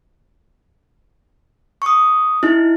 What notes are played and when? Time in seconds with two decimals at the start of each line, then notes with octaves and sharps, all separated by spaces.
1.82 C#6 D#6
2.43 D#4 E4